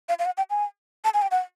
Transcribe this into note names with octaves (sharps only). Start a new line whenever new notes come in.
F5
F5
F#5
G5
G#5
A5
G#5
G5
F#5